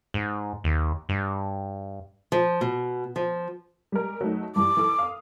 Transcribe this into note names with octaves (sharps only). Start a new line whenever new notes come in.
G#2
D#2
G2
F3
B2
F3
G3 G#3 A#4
F#3 A3 D#4
G2 E3 G3 D6
E3 A4
F5 D#6